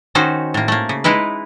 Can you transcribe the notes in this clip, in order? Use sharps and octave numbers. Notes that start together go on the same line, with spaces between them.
D#3 C#4 D#4 F#4 C5
A2 A#3
A3 A#3
C#3
G#3 D#4 E4 B4